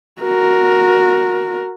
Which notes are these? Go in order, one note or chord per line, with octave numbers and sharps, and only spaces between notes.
F#4 A#4